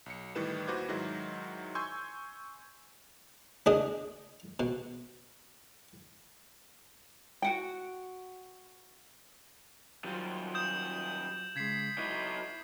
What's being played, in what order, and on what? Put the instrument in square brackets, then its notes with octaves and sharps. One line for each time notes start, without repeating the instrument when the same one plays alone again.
[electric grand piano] B1 C#7
A2 D#3 E3 G3 B4 E7
D#2 F#4 B4 C5 D6 G#6
G#2 D#3 F#3 E4 F#4
G#5 C6 C#6 E6 G6 G#6
[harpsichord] D2 D4 G#4 D#5 D#6
B2
[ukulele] F#4 F#5 G5
[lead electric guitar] D#3 G3 [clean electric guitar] F#3 F4 C5
[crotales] D#6 G6 E7
[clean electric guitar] C#3 G#3 [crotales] G#6 B6 C7
[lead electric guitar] F#3 D#4 [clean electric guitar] E4